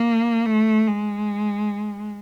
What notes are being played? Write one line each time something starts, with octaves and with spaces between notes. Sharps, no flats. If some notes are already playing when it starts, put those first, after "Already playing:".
Already playing: A#3
A3
G#3